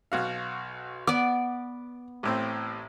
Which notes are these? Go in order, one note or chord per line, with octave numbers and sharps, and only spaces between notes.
B1 F#4 F5
B3 D5 D6
A1 A2 C4